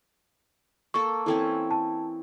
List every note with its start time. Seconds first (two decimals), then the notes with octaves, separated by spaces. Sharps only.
0.94 A#3 A4 C#6
1.26 E3 C4 C#4 E4 A4
1.71 A5